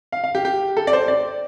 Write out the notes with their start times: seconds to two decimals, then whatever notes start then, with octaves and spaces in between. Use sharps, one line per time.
0.12 F5
0.24 F5
0.35 G4
0.45 G4
0.77 A4
0.87 D5
0.93 C5
1.08 D5